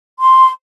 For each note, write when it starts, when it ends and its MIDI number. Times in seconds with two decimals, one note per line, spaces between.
0.20 0.50 84